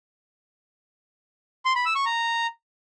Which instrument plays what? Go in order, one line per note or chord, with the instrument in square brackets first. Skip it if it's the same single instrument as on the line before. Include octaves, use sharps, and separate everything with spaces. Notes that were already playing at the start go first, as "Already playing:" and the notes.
[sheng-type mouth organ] C6
B5
E6
C#6
A#5